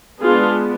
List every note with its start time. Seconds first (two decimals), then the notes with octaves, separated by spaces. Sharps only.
0.22 G#3 B3 D4 F4 G#4